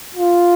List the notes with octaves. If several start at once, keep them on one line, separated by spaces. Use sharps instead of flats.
F4